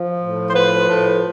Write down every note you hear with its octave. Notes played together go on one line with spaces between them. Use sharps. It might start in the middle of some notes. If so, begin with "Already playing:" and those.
Already playing: F3
A2
C5
F3 B4
A2